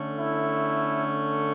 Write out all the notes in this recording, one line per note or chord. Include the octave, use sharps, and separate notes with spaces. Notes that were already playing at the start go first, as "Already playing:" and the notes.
Already playing: D3 A3 C#4
E4